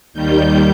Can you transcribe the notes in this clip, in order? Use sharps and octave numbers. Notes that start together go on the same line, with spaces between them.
D#2 D#3 G3 G6